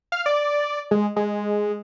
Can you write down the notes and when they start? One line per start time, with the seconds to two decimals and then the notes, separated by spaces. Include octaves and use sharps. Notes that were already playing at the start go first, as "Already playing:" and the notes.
0.12 F5
0.26 D5
0.91 G#3
1.16 G#3